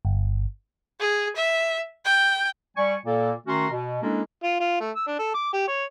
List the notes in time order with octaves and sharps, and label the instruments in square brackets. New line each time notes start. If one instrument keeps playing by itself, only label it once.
[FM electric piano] G1
[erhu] G#4
E5
G5
[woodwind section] G3 G#5 C#6
A#2 A#3 A4
D#3 A3 C#4 F#4 A#5 C6
B2
G#3 A#3 C#4 D4 E4 A4
[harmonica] F4
F4
A3
E6
D4
A4
D6
G4
C#5